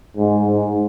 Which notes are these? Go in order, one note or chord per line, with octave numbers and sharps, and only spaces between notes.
G#2
G#2